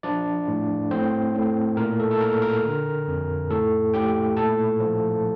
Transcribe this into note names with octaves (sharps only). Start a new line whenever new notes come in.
F3 D4 D5
A2
A2 C4 C5
A2
A#2 A#4
A4
A4
A#2 A#4
A#4
D3
F2
A2 A4
A2 G4 G5
A#2 A4 A5
F3